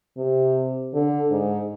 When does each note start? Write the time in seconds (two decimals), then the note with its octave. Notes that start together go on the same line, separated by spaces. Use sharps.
0.18 C3
0.94 D3
1.31 G#2